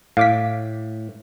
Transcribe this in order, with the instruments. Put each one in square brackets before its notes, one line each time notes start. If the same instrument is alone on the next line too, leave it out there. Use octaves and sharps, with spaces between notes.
[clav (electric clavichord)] A2 [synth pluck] F5 D6 B6